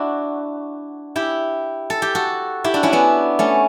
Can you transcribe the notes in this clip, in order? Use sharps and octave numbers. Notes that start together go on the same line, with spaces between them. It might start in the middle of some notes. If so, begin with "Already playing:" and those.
Already playing: D4 E4 F#4
E4 G4
A4
G4
F#4 A4
E4 G4
D4 F#4
C#4 E4
B3 D4
A3 C#4